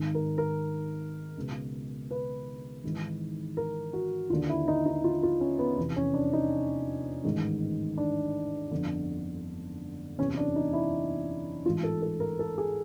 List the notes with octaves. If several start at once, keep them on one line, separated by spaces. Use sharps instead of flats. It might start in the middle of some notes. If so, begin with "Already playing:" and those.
Already playing: G#1 G#2 D#3
A#4
A#4
C#2 B2
B4
G#1 G#2 E3
A#4
F#4
D#2 D3 F4
E4
D#4
D#4
F4
F4
C#4
B3
F1 E2 C3 E3
C#4
D4
D#4
A1 G#2 D#3
D4
G1 F2 D3
F#1 E2 C3 E3 C#4
D4
D#4
E4
A1 G#2 E3 F4
A4
A4
A#4
A4
G#4